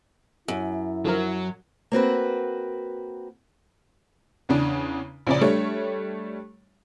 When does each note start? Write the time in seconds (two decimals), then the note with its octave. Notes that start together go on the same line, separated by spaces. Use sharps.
0.48 F#2 E4
1.05 D3 F3 F#3 A#4
1.92 A#3 C4 F#4 B4
4.49 E2 C#3 D4
5.27 A#1 C#3 D5
5.41 G3 A3 D4 C#5